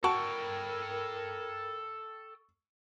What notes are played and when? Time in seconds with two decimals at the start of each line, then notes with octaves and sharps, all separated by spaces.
0.04 F#4 A4 A#4 F#5 G5 A5 C#6